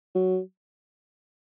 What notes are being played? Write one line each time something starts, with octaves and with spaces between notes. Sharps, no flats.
F#3